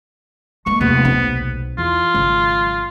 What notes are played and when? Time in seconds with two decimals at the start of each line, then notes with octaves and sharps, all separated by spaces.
0.66 G#3 A#3 C#6
0.81 F1 D#2 C3 A3 B3
1.05 B1 C4
1.78 E2 F4
2.14 G#1 C#3 F#3